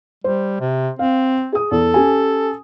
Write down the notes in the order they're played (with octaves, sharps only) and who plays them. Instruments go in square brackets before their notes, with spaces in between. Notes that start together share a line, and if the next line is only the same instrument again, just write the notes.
[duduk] G3 [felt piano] C5
[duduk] C3
[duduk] C4 [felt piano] F5
[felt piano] G#4 D#6
[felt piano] E2 [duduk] A4
[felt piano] C#4 G4 G#5